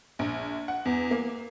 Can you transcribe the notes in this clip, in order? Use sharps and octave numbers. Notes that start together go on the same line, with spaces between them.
A#1
F#5
E2
A#3